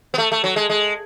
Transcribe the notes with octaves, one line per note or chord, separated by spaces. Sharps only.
B3
A3
A3
F#3
G#3
G#3